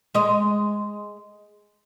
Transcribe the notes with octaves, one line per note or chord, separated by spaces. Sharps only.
G#3 D#5